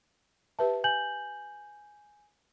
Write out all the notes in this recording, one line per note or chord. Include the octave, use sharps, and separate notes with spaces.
G4 B4 E5 A5
G#5 G6 F#7